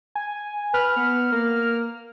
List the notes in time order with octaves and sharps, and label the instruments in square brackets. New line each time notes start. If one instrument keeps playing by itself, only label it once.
[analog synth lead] G#5
[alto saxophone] B4 [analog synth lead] F6
[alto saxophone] B3
A#3